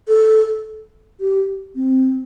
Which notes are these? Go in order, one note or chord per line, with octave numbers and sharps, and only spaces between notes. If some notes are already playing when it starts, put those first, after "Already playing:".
A4
G4
C4